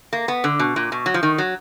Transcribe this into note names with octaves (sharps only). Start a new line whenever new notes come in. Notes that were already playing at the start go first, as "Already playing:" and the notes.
A#3
B3
D3
B2
A#2
B2
F#3
F3
D#3
F#3